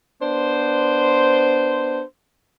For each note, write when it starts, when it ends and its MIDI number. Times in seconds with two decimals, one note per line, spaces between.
0.22 2.03 59
0.22 2.03 62
0.22 2.03 72